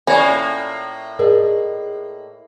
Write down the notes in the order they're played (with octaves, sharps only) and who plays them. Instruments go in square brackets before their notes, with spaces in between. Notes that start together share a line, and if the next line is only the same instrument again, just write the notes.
[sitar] A2 A#3 [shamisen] C#4 [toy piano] F4 D5 C#6
[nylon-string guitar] G#4 D5 D#5 [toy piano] A#4